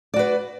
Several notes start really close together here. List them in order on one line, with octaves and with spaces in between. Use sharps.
D5 F#4 B4